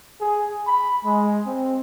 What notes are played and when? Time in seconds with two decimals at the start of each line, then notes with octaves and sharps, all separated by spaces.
0.21 G#4
0.67 B5
1.05 G#3
1.47 C4